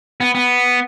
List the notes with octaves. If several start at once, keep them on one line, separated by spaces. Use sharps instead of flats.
B3
B3